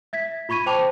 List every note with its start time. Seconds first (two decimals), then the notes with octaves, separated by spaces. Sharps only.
0.13 E5 G#6 B6
0.49 F4 B5 C#6 G#6 D#7
0.66 C5 G5 A5 D6 F7